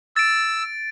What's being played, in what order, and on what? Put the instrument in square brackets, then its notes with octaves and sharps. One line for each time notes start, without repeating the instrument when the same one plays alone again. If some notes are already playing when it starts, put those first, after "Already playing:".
[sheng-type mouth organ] E6 [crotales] A6 D7